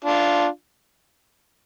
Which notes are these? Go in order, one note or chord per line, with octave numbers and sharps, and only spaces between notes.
D4 F4